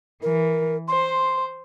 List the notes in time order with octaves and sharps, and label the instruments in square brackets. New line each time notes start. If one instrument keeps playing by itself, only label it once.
[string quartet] E3 [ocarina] A#4
[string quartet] C5 [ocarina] C6